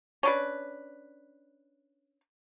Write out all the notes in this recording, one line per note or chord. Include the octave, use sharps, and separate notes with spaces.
C#4 D4 B4